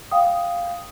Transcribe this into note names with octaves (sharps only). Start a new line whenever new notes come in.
F5 G5 D#6